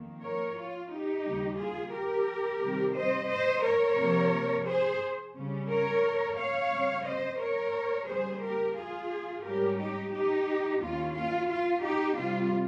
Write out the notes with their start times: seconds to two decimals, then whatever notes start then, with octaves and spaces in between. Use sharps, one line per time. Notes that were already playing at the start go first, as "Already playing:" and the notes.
Already playing: F2 D#3 A#3
0.23 A#4 C#5
0.57 F4
0.91 D#4 G4
1.25 D#2 C#3 G3
1.59 F4 G#4
1.93 G4 A#4
2.62 C3 D#3 G3 C4
2.95 C5 D#5
3.29 C5 D#5
3.64 A#4 C#5
3.98 C3 F3 A#3
4.66 G#4 C5
5.35 C#3 G3 C#4
5.69 A#4 C#5
6.37 C#5 F5
6.71 C#3 G3 C4
7.06 C5 D#5
7.40 A#4 C#5
8.08 C#3 G3 A#3 G#4 C5
8.42 G4 A#4
8.77 F4 G#4
9.44 G#2 G3 C#4 G4 A#4
9.78 D#4 G4
10.13 D#4 G4
10.81 D#2 D#3 A#3 C#4 F4
11.15 F4
11.50 F4
11.83 D#4 G4
12.18 C3 G3 C4 F4